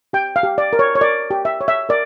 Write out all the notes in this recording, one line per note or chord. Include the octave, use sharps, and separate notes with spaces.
G4 G5
F5
G4
D5
A#4
C#5
C#5
A#4 D5
G4
E5
C#5
E5
A#4 D5